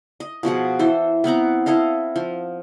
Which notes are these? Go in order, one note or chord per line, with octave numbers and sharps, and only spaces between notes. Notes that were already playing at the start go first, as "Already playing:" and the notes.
D#5
B2 F3 G#4 F#5
E3 A4 C5
B3 C4 F#5 A#5
E4 A4 D#5 F5
F3